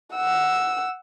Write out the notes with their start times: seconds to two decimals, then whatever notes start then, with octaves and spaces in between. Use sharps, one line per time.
0.15 F#5 E6